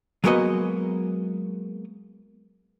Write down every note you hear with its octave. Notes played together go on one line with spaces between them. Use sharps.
F#3 G#3 A#3 B3 F#4 D#5